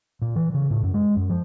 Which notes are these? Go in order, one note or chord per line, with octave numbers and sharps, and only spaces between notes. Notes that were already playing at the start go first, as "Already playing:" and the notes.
A#2
E3
C#3
A2
F#2
G#3
F#2
F3